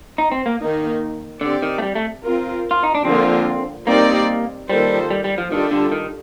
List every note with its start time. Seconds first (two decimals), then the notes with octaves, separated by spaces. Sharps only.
0.18 D#4
0.32 C4
0.46 A#3
0.60 D#3 A#3 D#4
1.41 D3 C4 G4 D5
1.63 D#3
1.78 A3
1.82 G3
1.95 A3
2.24 C4 F4 A#4
2.71 F4
2.83 D#4
2.95 D4
3.05 D3 F3 A#3 C4 F4
3.87 G3 A#3 C4 D#4 A#4 D5
4.69 D#3 G3 A#3 F4 A4 C5
5.10 G3
5.24 G3
5.38 F3
5.51 D#3 G3 D4 F4 A4
5.71 D3
5.92 D#3